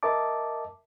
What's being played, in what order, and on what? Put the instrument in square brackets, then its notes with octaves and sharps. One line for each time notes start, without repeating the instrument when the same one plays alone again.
[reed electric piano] A#4 D#5 E5 A5 D6